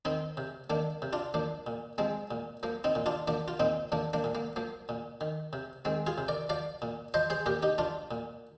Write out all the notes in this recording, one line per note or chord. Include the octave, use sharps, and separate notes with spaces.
D#3 C4 D#4
C3
D#3 A#3 D4
C3
D4 F4
F3 A#3 D4
A#2
F3 G#3 C4
A#2
F3 A#3
C4 D#4
A#2
D4 F4
F3 A#3 D4
F4
A#2 C4 D#4
F3 A#3 D4
A#3 D4
A#2
A#3
F3 A#3
A#2
D#3
C3
D#3 G#3 C4
F4 G#4
C3
A#4 D5
F3 D5 F5
A#2
F3 C5 D#5
G#4 C5
A#2 G4 A#4
D#4 G4
F3 D4 F4
A#2